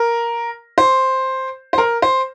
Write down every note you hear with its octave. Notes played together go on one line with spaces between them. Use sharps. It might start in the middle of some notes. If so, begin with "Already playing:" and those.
Already playing: A#4
C5
C5
A#4
C5